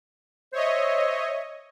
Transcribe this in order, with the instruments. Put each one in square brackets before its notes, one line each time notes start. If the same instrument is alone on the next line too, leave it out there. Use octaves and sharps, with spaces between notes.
[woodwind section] C5 E5 [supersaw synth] C#5 D#5